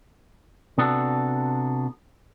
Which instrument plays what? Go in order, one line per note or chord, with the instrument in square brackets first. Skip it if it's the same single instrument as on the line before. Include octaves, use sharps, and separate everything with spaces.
[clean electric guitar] C3 B3 D4 F#4 A4